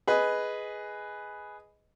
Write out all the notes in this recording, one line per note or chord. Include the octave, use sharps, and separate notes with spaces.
G#4 B4 D#5